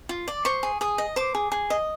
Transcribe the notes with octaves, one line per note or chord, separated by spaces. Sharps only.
F4
D5
C5 C#6
G#4
G#4 D#6
D#5
C5 D6
G#4
G#4
D#5